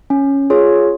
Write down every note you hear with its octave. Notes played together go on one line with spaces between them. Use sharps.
C#4
F4 G#4 C#5